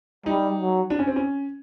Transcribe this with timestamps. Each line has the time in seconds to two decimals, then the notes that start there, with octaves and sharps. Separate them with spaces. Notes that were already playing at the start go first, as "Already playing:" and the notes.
0.26 G3 D#4
0.59 F#3
0.90 D4
0.99 C#4
1.07 C4
1.16 C#4